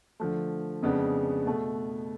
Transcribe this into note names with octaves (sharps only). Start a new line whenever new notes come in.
D3 F3 A3
F2 C#3 G#3 B3 D4
B2 A3